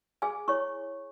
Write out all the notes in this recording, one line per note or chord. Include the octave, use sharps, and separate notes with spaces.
G#4 G#5
E4 C#5 C#6